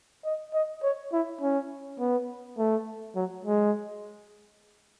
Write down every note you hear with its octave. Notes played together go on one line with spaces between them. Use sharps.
D#5
D#5
C#5
E4
C#4
B3
A3
F#3
G#3